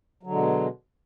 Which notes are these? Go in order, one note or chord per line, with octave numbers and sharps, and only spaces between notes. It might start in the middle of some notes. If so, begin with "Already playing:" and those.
B2 D3 F#3 G#3